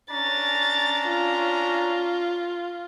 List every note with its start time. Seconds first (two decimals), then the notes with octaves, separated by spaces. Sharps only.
0.11 C#4 D4 A#5 A6
1.08 F4